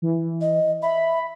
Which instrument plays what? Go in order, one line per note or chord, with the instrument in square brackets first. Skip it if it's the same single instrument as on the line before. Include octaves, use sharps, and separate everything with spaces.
[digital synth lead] E3
[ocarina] D#5
[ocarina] E5 [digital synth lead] B5